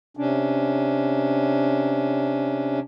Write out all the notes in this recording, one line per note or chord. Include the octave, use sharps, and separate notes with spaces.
C3 C#4 D4